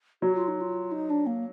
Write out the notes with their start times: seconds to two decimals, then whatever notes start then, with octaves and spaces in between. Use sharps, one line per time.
0.22 F#3 F#4
0.35 F4
0.48 D#4
0.61 F4
0.91 D#4
1.09 D4
1.26 A#3